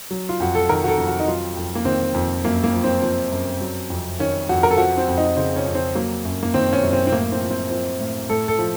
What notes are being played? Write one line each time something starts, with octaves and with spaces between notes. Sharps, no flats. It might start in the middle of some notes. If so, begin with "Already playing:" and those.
F#3
F4
F2 F#4
A4
D#3 A#4
F#4
A4
F2
F#4
D#4
F#3 F4
F2
A#3
D#3 C4
F2
F#2 A#3
A#3
F3
C4
F3 C4
F#2
F#3
F2
D#3 C#4
F2 F#4
A#4
A4
F3 F#4
C4
F2
D#4
C#3 C4
C#4
F2
C4
F#3 A#3
F#2
A#3
D#3 C4
C#4
F#2
C4
C4
A2 A#3
C4
F3
C4
F3 C4
A2
A2 A4
A4
F3